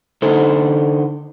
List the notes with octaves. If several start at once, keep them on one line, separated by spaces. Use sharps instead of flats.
D3 D#4 A4 C5